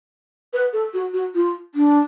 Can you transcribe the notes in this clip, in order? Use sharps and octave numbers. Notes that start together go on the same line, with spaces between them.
B4
A4
F#4
F#4
F4
D4